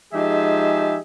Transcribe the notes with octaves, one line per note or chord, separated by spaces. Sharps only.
F3 G#3 D#4 G4 G#4 E5